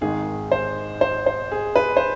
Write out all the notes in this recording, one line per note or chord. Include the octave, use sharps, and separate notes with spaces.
G#1 G#2 D#3 G#3 G#4
C5
C5
C5
G#4
B4
C5